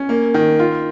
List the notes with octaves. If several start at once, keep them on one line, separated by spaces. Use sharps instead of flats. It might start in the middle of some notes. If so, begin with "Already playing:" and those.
Already playing: C#4
A#3
D#3
F4